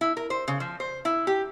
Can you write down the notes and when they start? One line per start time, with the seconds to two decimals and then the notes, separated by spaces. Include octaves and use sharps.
0.01 E4
0.17 A#4
0.30 C5
0.48 C#3
0.60 F3
0.80 C5
1.05 E4
1.27 G4